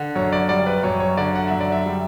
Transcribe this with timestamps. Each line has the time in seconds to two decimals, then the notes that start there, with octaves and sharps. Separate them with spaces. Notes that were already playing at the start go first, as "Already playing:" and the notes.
Already playing: D3
0.16 F#2 C#5
0.32 D5
0.49 G3 D5
0.67 B4
0.83 F#2 C#5
1.00 C#5
1.17 D3 D5
1.35 F#5
1.47 F#2 E5
1.61 D5
1.72 E5
1.86 G3